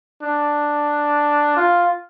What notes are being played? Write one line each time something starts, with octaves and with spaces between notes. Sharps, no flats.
D4
F4